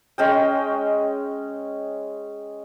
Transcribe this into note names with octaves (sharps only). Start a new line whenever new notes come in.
G#3 C#4 G5